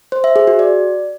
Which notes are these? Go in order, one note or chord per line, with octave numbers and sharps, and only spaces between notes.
C5
E5
G#4
F#4
D5